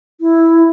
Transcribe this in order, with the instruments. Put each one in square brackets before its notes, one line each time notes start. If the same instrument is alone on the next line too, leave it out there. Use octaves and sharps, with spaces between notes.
[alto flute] E4